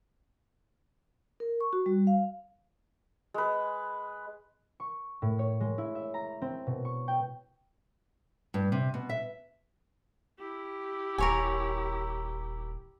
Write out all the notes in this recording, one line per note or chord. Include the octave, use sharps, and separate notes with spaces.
A#4
C#6
F#4
G3
F5
G#3 B4
C#6
A2
C#5
G#3
E4
E5
A#5
C4
B2
C#6
G5
G2
C3
B2
E5
E4 G4
D#1 A#4 C#5 G#5